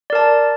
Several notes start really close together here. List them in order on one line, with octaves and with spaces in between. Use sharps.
D5 A#4 A5